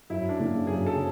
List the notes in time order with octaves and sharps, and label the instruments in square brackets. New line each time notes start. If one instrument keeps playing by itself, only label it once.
[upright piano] F#2 [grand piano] E4
[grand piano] D4
[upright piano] C#3 F#3 A#3
[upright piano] F#2 [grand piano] G#4
[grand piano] A4
[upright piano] C#3